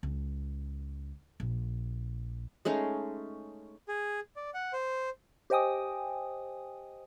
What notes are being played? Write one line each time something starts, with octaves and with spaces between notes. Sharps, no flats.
C#2
A#1
G#3 A3 C#4 D#4
G#4
D5
F#5
C5
G4 C5 D#5 G5 G#5 D#6